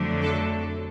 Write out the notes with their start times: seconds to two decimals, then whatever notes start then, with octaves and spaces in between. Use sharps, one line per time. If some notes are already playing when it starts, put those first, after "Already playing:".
Already playing: F2 D3 F#3 A3 D4
0.21 A4